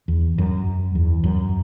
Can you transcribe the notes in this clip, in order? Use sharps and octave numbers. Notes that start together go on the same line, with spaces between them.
E2
F#2
E2
F#2